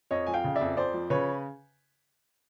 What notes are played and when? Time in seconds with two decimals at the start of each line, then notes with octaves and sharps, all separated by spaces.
0.11 F2 C#5 D#5
0.27 F3 G#5
0.34 F5 G5
0.44 C#3
0.55 D5 E5
0.61 F2
0.77 F2 C5 D5
0.94 F3
1.10 C#3 B4 C#5